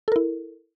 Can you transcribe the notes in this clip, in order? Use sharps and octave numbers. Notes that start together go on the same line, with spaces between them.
E4 A4 A#4